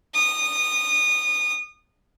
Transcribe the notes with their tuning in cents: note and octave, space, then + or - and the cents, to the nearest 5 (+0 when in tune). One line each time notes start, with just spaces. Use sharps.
D#6 -25